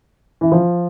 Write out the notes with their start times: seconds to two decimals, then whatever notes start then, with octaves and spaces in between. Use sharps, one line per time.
0.41 E3
0.52 F3